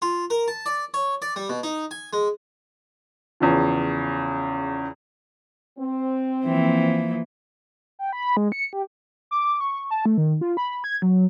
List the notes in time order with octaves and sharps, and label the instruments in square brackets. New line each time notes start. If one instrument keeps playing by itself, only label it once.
[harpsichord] F4
A#4
A5
D5
C#5
D5
G3
B2
D#4
G#5
G#3
[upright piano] E2 C#3 F3
[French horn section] C4
[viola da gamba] E3 F3 A#3
[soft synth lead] G5
B5
G#3
C#7
G4
D6
C#6
A5
A3
D#3
F4
B5
G#6
F#3